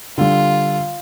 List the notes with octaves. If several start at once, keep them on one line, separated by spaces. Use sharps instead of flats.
D3 G3 F4